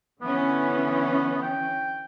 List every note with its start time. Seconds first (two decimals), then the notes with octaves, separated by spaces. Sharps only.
0.22 D3 E3 B3 C#4
1.42 G5